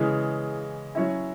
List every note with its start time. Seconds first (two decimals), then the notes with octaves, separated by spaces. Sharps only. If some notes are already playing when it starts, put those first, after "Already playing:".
Already playing: C#3 E3 G#3
0.95 F#3 C#4 E4